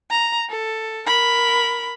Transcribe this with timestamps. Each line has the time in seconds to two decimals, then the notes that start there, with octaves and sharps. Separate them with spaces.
0.11 A#5
0.50 A4
1.06 A#4 B5